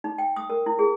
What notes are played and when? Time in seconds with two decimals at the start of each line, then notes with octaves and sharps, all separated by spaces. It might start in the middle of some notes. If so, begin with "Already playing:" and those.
0.04 D#4
0.18 G5
0.36 D#6
0.50 A#4
0.66 E4
0.79 G#4